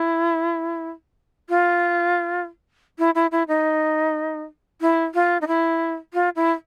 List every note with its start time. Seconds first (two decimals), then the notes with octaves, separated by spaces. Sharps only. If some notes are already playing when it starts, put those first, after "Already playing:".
Already playing: E4
1.49 F4
2.99 E4
3.15 E4
3.32 E4
3.48 D#4
4.81 E4
5.14 F4
5.41 D#4
5.47 E4
6.14 F4
6.36 E4